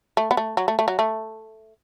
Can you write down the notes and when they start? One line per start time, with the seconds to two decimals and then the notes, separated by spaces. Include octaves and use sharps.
0.17 A3
0.31 B3
0.37 A3
0.57 F#3
0.68 A3
0.79 A3
0.88 F#3
0.99 A3